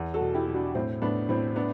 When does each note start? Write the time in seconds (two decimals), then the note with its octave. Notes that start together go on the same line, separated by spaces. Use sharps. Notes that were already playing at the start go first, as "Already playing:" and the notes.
Already playing: E2
0.14 F#4 A4
0.21 B2
0.34 E4 G4
0.48 B2
0.55 D4 F#4
0.75 A2 C4 E4
1.02 A2 B3 D4
1.29 A2 C4 E4
1.56 B3 D4